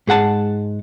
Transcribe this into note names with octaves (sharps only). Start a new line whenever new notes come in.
G#2 G#4 F#5 A5